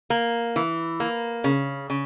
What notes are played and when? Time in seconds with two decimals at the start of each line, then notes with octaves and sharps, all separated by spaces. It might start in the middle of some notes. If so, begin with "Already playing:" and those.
0.10 A#3
0.56 E3
1.00 A#3
1.44 C#3
1.90 C#3